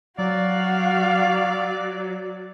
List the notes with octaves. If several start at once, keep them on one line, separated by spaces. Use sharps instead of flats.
F#3 F#4 D5 F5